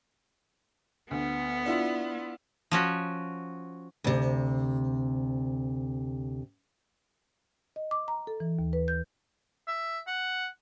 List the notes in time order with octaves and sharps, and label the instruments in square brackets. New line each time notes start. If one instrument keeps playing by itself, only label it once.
[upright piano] D2 [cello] B3
[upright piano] D4 E4 F4
[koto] F3 C#4 F#4
[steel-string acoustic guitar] D2 C3
[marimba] D#5
D6
A#5
A4
E3
D#2
B4
G6
[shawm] E5
F#5